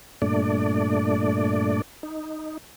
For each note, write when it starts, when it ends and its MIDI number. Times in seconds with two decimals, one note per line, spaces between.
0.22 1.82 43
0.22 1.82 46
0.22 1.82 57
0.22 1.82 62
0.22 1.82 74
2.03 2.58 63